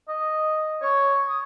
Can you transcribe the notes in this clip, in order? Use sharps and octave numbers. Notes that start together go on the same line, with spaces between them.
D#5
C#5
D#6